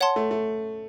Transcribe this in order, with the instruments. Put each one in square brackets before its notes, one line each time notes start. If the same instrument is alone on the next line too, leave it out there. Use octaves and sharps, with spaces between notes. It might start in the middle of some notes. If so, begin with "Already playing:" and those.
[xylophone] C#5 F#5 A5 C6
[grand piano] A3
A3